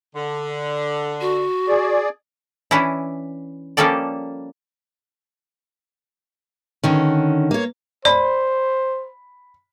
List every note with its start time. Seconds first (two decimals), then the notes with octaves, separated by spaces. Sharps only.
0.16 D3
1.20 F#4
1.67 G#4 D5
2.71 E3 C#4 D4 E4
3.77 F3 G3 A#3 C#4 A4 D5
6.84 D3 D#3 C#4
7.51 A#3 C#5
8.05 C5 D5 B5